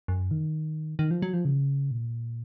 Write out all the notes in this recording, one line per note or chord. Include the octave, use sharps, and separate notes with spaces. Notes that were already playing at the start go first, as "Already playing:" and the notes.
F#2
D#3
D#3
F3
F#3
F3
C#3
A#2